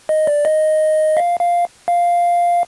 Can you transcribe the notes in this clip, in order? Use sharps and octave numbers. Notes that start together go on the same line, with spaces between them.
D#5
D5
D#5
F5
F5
F5